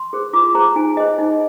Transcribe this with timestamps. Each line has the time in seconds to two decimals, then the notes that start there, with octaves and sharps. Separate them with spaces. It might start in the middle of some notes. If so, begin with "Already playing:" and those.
Already playing: C6
0.13 G#4 C5
0.33 F4 D6
0.55 G#4 C5 A#5
0.76 D#4 G#5
0.97 G#4 C5 D#5
1.19 D#4